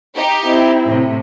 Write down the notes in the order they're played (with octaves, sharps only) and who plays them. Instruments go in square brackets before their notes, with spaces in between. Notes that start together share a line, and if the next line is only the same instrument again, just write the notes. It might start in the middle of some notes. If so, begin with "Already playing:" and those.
[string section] D#4 G4
[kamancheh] C4 E4
[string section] A2 C3